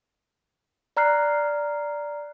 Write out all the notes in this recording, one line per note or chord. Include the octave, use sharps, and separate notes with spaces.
D5 A#5 F6 F#6 C7